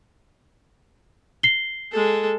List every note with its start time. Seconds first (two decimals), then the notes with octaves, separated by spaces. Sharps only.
1.43 C7 G7
1.91 G#3 A4